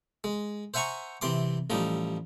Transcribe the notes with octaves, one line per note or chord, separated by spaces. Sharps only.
G#3
C5 E5 F#5 G#5 A#5 C#6
C3 E3 C6 D6
A1 F3 G3 D#4